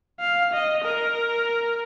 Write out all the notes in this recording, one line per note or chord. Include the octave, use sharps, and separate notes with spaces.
F5
D#5
A#4